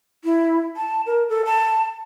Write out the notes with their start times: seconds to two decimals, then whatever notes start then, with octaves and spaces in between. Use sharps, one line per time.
0.24 E4
0.77 A5
1.07 A#4
1.29 A4
1.45 A5